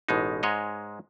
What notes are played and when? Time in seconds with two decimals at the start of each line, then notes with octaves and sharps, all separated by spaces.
0.09 A1 B2 G#3 D#4
0.43 G#2 G#3 C#5 D#5